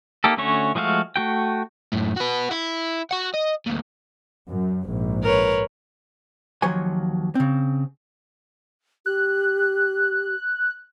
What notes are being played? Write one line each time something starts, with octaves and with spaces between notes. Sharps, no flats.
A#3 D#4 G4 A4
D3 A3 C#4 F#4 C#5
F3 G#3 A3 F#4 F5
A3 F#4 G5
F#2 A2
F#4 B4
E4
F#4 F#5
D#5
D2 A#2
F#2
A#1 G#2
A#4 B4 C#5
D#2 F3 F#3 C5 C#5 G#5
C#3 C4
G4 F#6